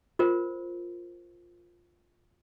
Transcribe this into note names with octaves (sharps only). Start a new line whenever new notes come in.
F4 A#4 C5